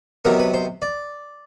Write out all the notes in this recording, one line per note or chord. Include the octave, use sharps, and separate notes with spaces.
C3 D#3 F#3 B3 A#4
B4
C5
D5